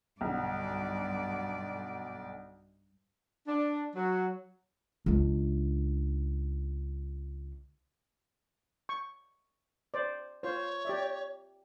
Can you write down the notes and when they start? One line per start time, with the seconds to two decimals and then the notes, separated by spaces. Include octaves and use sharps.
0.21 B1 G2 D3 D5
3.48 D4
3.95 F#3
5.06 C#2 D4
8.89 C#6
9.94 C5 D5
10.43 F4 C5 C#5
10.85 G4 D5 E5